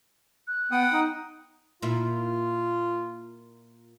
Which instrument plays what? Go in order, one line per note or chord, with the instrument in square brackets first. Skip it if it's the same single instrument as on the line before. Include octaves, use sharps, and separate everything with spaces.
[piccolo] F#6
[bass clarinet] B3 [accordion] F#5 G5 D#6
[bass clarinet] D#4
[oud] A#2 E4 [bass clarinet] F4